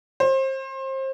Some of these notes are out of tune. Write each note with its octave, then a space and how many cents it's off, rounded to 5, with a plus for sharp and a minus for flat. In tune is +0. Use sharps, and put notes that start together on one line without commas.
C5 +30